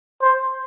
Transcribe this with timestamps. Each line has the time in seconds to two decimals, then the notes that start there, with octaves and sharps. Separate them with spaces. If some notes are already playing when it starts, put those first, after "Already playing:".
0.22 C5